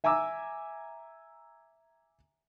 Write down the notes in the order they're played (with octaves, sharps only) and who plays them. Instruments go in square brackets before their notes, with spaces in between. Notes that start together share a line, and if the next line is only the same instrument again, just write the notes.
[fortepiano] E5 G#5 A#5 D6 E6